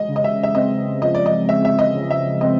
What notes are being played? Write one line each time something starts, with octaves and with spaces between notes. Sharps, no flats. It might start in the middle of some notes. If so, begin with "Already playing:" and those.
Already playing: G#3 D#5
C#3
D#5
E5
E5
C4 D#5
F3 D#5
D5
D#5
G#3 E5
E5
D#5
C#3
E5
C4 D#5